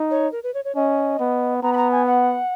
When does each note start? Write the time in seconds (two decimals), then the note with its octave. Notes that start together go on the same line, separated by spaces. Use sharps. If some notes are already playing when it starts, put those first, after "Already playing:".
Already playing: D#4
0.11 C#5
0.32 A#4
0.43 B4
0.54 C#5
0.65 C#5
0.76 C#4 D#5
1.19 B3
1.62 B3 A#5
1.73 B5
1.77 A#5
1.92 G#5
2.06 F#5